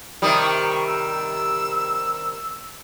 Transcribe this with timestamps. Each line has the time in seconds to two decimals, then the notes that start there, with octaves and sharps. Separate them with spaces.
0.22 C3 D#3 G3 D#6
0.42 C#6
0.87 E6